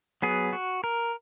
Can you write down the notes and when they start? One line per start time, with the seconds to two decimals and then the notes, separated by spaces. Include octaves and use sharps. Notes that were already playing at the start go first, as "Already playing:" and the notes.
0.22 F#3 B3 G#4
0.53 F#4
0.84 A#4